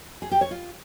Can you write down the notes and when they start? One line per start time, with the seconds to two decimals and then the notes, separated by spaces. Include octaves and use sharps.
0.22 G#4
0.32 G4
0.41 C#5
0.51 F4